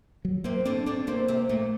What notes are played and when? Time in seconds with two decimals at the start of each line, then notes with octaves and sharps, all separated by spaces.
0.25 F#3
0.44 C3 A#3 C4
0.65 D3 C4 D4
0.86 D3 C4 D4
1.07 C3 A#3 C4
1.28 C3 C4
1.49 A#2 A3 A#3